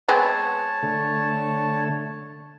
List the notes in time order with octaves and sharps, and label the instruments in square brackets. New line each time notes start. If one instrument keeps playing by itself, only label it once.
[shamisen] G#3 B3 C4 [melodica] C#5 A5
[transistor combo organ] D3 A3